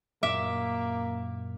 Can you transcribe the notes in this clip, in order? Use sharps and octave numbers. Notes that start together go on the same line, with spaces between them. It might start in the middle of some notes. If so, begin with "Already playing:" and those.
F#2 A#2 A#3 E5 D6 B6